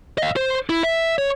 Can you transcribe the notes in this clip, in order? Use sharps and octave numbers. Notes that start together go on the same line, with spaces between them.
D#5 F5
C5
E4
E5
C#5